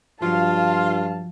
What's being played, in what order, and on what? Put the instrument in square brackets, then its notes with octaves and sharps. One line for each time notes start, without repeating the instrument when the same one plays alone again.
[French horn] G2 [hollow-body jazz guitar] F3 F#3 [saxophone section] F4 [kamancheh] F5 A5